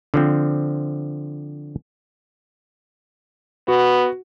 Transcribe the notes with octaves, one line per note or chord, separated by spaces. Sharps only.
D3 F3 C4
B3 F#4